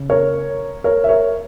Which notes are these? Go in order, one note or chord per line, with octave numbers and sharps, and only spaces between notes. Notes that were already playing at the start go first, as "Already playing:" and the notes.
Already playing: C#3
A#4 C#5
A#4 C#5
E5
A#4 C#5